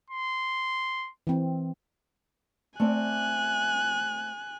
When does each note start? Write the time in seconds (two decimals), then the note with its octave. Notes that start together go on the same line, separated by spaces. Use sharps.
0.10 C6
1.27 E3 C4
2.80 A3 C4 D5 G#5 F#6